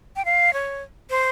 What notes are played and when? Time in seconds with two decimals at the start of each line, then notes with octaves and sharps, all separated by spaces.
0.16 G5
0.25 F5
0.53 C#5
1.10 C5